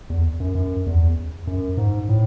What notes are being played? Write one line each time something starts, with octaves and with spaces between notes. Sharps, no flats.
E2
F#2
F#2
E2
F#2
G#2
A2